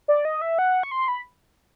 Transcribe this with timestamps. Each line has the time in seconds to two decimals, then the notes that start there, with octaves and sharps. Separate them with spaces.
0.08 D5
0.25 D#5
0.42 E5
0.59 F#5
0.83 C#6
0.91 C6
1.08 B5